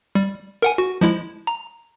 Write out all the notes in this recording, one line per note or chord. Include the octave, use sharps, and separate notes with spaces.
G3
A#4 F#5 G#5
F#4
F3 G#3 E4
A#5